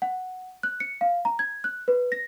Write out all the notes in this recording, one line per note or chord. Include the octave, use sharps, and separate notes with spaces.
F#5
F#6
C#7
F5
A#5
G#6
F#6
B4
A#6